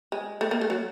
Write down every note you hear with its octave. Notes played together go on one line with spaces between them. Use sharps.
G#3
A3
A#3
A3
F#3